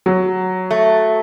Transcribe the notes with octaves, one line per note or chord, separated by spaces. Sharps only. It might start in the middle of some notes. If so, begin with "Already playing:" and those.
F#3
A3